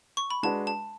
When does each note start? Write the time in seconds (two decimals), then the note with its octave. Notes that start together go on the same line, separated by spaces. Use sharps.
0.17 C#6
0.30 B5
0.43 G#3 D4 F#4 B4 A5
0.67 A5